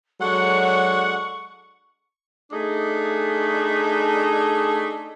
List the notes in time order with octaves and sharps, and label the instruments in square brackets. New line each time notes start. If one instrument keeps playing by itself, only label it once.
[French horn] F#3 [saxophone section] G#3 D4 A4 [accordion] F#5 [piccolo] C#6
[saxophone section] A3 D4 D#4 G#4